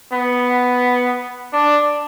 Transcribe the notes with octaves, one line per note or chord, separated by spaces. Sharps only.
B3
D4